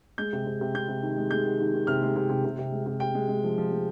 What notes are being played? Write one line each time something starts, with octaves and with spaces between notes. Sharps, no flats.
G#3 G6
C3
C3
C3
C3 G6
C3
D#3
G#3
G#3 G6
D#3
D#3
D#3
C3 F6
G#3
C3
C3
C3
C3
G#3
C3
C3 G5
G#3
G#3
F3
F3
G#3